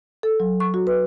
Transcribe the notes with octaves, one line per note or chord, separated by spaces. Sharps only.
A4
F#3
C#6
F#4
B4